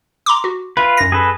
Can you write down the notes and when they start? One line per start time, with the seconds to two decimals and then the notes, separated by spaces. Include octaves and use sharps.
0.26 A#5 C6 D6
0.44 F#4
0.77 F4 B4 E5
0.97 F#2 A#6
1.12 G#4 A4 B4